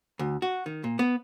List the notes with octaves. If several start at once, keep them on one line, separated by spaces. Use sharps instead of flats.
D2
F#4
D#3
A#2
B3